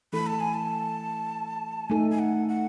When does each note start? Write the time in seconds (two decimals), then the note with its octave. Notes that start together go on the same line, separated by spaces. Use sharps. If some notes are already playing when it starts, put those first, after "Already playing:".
0.13 E3 A3 E4 A4 B5
0.27 A5
0.40 G#5
0.54 A5
1.89 A3 D#4 A4 G#5
2.11 G#5
2.19 F#5
2.48 F#5